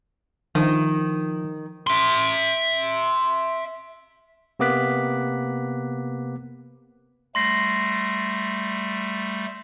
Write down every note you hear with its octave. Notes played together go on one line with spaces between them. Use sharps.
D#3 F3
E5 C6
C3 A#3 B3 D6 F#6 B6
G3 A3 C6 A#6 C7